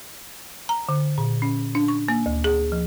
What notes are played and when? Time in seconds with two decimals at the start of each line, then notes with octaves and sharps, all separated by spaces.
0.69 A#5
0.89 D3
1.18 A#2
1.42 C#4
1.75 D4
1.88 C#6
2.08 A#3
2.26 D2
2.44 G#4
2.72 F3